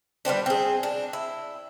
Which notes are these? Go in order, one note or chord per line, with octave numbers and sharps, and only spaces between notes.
G3 B3 C4 D4
C4 G#4
D4
E4